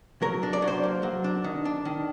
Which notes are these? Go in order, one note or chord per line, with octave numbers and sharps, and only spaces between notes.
F#3 A#4
D4
D5
F#3
C5
A#3
F#3
D4
D#3
D4
D#3